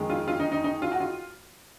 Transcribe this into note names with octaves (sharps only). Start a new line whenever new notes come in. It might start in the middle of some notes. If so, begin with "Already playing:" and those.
Already playing: F2 D#3 G#3
F4
F4
D#4
D#4
D#4
F4
F#4
F4